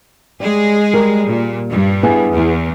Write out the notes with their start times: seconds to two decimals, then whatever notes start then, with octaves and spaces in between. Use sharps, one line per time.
0.40 G3 G#3 G#4
0.93 G3 A#4
1.26 A#2
1.70 G2
2.03 B3 E4 G#4
2.33 E2